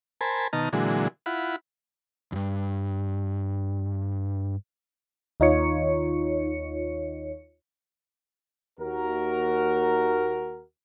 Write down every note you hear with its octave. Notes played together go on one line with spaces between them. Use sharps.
A#4 C5 G#5 A5 B5
B2 D#3 D#5 A5 A#5 F6
A#2 D3 E3 F#3 G#3
E4 F4 F#5 B5
E2 G2
D#2 D#4 F4 C#5 C#7
D#2 F#4 A#4